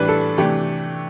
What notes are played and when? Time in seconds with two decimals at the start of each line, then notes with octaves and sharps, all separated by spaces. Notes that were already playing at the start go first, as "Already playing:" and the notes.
Already playing: A2 E3 G3 D4 B4
0.09 A4
0.37 C3 E3 A3 D4 G4